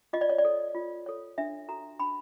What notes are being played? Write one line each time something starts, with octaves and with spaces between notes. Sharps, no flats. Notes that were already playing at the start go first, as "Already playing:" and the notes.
F4 D#5
D5
C#5
D5
A4 C#5
F4
A4 C#5
D4 E5
F#4 A4 A#5
D4 B5